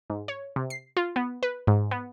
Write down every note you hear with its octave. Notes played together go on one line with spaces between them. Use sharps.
G#2
C#5
C3
C7
F4
B3
B4
G#2
B3